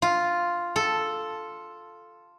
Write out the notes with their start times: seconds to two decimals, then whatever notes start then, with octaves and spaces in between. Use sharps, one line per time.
0.02 F4
0.76 A4